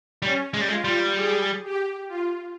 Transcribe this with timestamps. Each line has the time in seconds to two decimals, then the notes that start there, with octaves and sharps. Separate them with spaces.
0.22 G3 C#4
0.54 G#3
0.61 G3
0.69 G#3 F4
0.85 G3
1.15 G#4
1.62 G4
2.09 F4